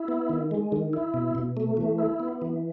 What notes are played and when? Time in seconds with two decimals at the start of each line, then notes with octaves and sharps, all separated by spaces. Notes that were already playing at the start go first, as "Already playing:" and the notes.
Already playing: E4
0.08 B3
0.29 D#3
0.51 G#3
0.72 D#3
0.93 E4
1.14 B2
1.35 B2
1.57 A3
1.77 E3
1.98 E4
2.20 B3
2.42 E3